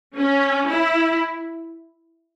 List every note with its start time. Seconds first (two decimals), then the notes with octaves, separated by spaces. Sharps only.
0.16 C#4
0.68 E4